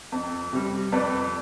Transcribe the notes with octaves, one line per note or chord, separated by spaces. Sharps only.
F2
C3 G3
F2 B4 D5